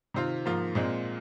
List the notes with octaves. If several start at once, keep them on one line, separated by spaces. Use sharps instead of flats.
C3 D#3 C4 F4
G#2 F3 A#3 F4
A#2 G#3 C4 F4